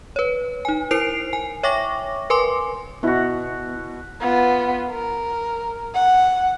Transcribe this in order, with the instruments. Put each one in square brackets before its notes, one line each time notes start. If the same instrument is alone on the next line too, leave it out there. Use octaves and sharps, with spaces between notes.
[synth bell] B4 C#5
D#4 G#5
E4 A#4 C5 C7 D7 F7
G#5
C#5 E5 G5 C#6 D6 A#6
A#4 B4 G#5 C6 D6
[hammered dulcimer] B2 F#4 [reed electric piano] B3 E4
[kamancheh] B3 F4
A#4
F#5